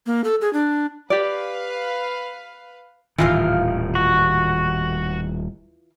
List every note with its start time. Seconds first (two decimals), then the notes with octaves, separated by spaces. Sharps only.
0.06 A#3
0.24 A4
0.41 G#4
0.53 D4
1.10 G4 B4 D5 F5
3.18 D#1 A2 D#3 E3 F4 F5
3.95 F#4